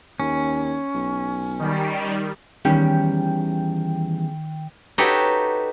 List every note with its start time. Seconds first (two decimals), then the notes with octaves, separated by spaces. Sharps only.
0.20 D#2 C#4
0.94 B1
1.59 D#3 G3
2.65 E2 D#3 G3 C#4 G5
4.98 D#4 F#4 G4 A4 B4 C#5